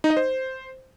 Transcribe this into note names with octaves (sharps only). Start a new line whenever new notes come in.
D#4
D#5
C5